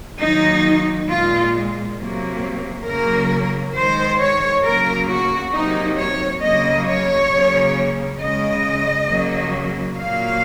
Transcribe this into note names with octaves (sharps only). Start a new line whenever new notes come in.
D#3 F#3 A#3 D#4
A#2 G#3 F4
C3 F#3 A#3
C#3 F#3 A#3 A#4
D#3 G#3 C5
C#5
C#3 F#3 A#3 A#4
F#4
C3 F#3 A#3 D#4
C#5
C#3 F#3 A#3 D#5
C#5
C#3 F#3 A#3
C#3 G#3 D#5
C#3 F#3 A#3
A#2 F#3 A#3 F5